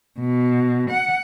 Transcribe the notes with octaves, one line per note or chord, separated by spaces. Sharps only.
B2
F#5